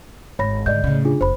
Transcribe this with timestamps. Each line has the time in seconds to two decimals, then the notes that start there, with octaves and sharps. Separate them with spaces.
0.39 G#1 C#5 B5 A#6
0.66 G#2 D3 D5 D#5 G6
0.84 A2 C#3
1.05 D4 F4 G#4
1.21 F1 C5 B5